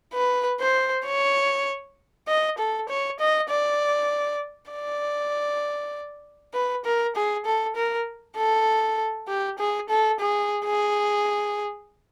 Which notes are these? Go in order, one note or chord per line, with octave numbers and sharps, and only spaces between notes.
B4
C5
C#5
D#5
A4
C#5
D#5
D5
D5
B4
A#4
G#4
A4
A#4
A4
G4
G#4
A4
G#4
G#4